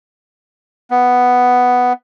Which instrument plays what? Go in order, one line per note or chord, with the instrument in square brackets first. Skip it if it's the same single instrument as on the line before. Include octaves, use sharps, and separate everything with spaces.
[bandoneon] B3